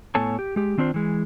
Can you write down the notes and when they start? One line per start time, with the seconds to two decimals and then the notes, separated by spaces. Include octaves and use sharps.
0.15 A2 B3 A4 C#5 G#5 A5
0.39 G4
0.56 G#3 G4
0.78 D#3 C4 D4 F4 C5
0.94 E3 G#3